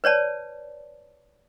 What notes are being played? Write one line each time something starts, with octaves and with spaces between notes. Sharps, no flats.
B4 C#5 D5 A5